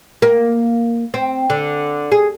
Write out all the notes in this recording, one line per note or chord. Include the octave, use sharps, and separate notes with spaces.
A#3
C4
D3
G#4